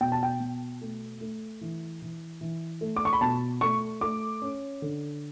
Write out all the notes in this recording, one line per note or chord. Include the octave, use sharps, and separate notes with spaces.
B2 G5
A5
G5
B2
A3
A3
E3
E3
E3
A3
D6
C#6
B5
B2 A5
A3 C#6
A3 D6
C#4
D3